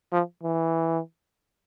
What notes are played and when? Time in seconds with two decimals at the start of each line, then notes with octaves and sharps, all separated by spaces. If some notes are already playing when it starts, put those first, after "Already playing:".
0.12 F3
0.43 E3